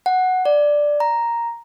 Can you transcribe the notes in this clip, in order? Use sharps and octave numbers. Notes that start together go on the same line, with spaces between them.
F#5
D5
A#5